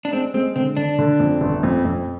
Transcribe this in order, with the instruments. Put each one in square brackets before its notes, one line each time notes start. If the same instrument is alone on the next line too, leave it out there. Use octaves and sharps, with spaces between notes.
[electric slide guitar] D4
[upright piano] G#3 [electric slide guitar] C4
[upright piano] G#3 [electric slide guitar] C4
[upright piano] D3 [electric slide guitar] C4
[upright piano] D3 [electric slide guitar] D4
[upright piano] D3
F2
G1
F2
F2